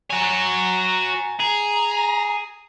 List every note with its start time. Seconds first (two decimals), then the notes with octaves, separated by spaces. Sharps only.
0.10 F#4 C#5 G#5 A#5
1.40 G#4 A#5